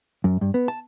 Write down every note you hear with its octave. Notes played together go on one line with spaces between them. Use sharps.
F#2
G2
B3
A5